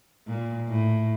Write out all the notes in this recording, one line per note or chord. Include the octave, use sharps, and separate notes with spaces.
A#2
A2